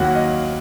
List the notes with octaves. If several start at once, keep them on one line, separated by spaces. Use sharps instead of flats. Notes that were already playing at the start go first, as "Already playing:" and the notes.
Already playing: D#2 D#3 F#3 A#3 F#4 F#5
D#5